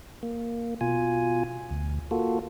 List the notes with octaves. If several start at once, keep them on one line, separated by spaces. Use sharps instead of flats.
A#3
B2 F4 G#5
D2
A#3 F4 F#4 A4